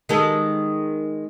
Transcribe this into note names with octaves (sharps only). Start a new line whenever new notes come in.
D#3 G#3 A4